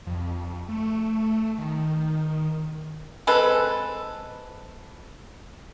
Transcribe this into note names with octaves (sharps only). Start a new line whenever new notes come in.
F2
A3
D#3
G#3 C4 A4 B4